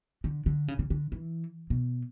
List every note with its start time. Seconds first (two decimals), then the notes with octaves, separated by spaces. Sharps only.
0.24 D3
0.46 D3
0.68 C#3
0.79 C#3
0.90 D3
1.12 E3
1.70 B2